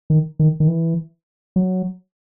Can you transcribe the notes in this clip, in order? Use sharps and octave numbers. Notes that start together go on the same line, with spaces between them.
D#3
D#3
D#3
E3
F#3